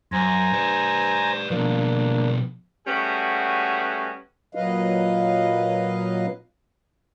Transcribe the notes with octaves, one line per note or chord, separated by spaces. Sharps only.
F#2 C5 G#5 A#5
B4 D5
B2 F3 A#3 D4
G3 A3 B3 C#4 F#4 G#4
A#2 F#3 B4 D#5 F5